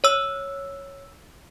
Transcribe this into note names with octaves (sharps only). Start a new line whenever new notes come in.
C#5 E6